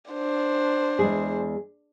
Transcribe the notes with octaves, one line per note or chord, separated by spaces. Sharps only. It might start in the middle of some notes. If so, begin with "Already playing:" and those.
D4 C5
E2 G#3 G#4